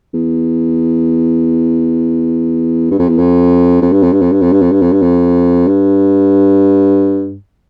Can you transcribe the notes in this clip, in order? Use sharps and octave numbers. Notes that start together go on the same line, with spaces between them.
E2
G2
F2
E2
F2
F2
G2
F2
G2
F2
G2
F2
G2
F2
G2
F2
G2
F2
G2